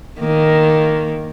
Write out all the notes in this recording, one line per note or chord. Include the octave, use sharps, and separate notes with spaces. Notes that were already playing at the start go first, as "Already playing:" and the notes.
D#3 A#3